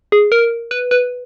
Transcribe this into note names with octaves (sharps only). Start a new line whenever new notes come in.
G#4
A#4
B4
B4